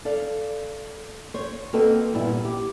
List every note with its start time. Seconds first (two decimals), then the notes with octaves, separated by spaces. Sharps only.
0.05 A4 D5 F5
1.34 C5 C#5
1.73 A#3 C4 F#4 A4 B4 D#5
2.13 G2 A#2 G3 B3 E4
2.45 G4